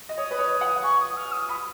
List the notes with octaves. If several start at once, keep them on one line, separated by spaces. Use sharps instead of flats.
D#5
C#5 D#6
B4
C#5
F#5
F#5
G#5 C#6
D#6
F6
D#6
B5 D#6